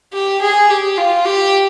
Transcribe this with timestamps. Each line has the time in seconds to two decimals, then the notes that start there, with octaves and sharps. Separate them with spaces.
0.13 G4
0.41 G#4
0.70 G4
0.98 F4
1.25 G4